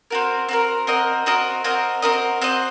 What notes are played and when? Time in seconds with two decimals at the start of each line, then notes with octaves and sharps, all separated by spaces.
0.10 C4 F#4 A#4
0.49 C4 F#4 A#4
0.87 C4 F#4 A#4 D#5
1.26 C4 F#4 A#4 D#5
1.64 C4 F#4 A#4 D#5
2.02 C4 F#4 A#4 D#5
2.42 C4 F#4 C5 D#5